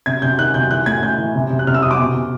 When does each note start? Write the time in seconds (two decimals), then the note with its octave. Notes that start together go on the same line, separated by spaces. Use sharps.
0.06 C3 G#6
0.22 C3 G6
0.38 D#3 F#6
0.54 C3 G6
0.71 E3 F#6
0.86 A2 G#6
1.02 A2 G6
1.18 E3
1.35 C3
1.50 C3
1.59 F#6
1.67 C3 F6
1.74 E6
1.82 C3 D#6
1.91 D6
1.99 B2
2.14 B2